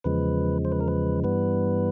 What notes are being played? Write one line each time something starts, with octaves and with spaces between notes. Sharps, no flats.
E2 C#3 F3 G#3 B4
C5
B4
A#4
B4
G2 E3 G3 B3 B4